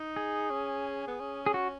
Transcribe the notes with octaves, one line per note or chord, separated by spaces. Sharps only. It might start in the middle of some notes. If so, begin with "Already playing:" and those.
Already playing: D#4
G#4
C#4
B3
C#4
G#4
F#4